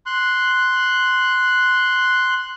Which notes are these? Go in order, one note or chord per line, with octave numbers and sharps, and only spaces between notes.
C6 F#6